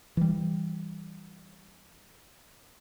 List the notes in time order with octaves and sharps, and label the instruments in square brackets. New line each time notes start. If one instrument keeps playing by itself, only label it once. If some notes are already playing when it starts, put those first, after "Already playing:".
[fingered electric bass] E3 G3